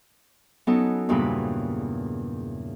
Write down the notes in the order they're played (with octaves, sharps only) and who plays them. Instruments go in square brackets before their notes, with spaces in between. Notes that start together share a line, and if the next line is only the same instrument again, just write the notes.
[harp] F#3 B3 C#4 D#4 A4
E2 G2 A#2 C#3 B4